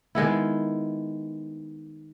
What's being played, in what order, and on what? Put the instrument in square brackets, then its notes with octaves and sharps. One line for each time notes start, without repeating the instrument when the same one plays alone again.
[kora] D#3 G#3 B3 E4